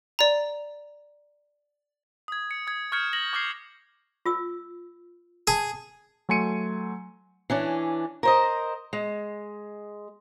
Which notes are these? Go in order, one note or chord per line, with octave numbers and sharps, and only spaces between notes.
D5 A#5
D#6 G#6
C#7
D#6 G#6
C#6 F6 G6 G#6 C#7
A#6 F#7
C#6 D6 F6 G6 G#6 C7
F4 E6
G#4 A5
F#3 A3 G#5 C6 C#7 D#7
E3 C#4 D4
A#4 C5 D#5
G#3